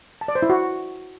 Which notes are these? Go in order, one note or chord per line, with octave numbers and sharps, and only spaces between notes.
A5
D5
C5
E4
F#4